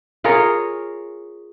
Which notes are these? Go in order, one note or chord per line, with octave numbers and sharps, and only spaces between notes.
F4 G#4 A#4 C#5